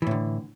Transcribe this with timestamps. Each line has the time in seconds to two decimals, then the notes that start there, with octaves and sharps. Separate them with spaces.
0.02 E3
0.07 A2
0.11 D3